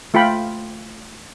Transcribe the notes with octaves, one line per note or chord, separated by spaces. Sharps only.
A3 F4 F5 G5 B5